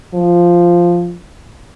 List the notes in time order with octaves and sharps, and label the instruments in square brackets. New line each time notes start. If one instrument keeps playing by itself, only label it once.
[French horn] F3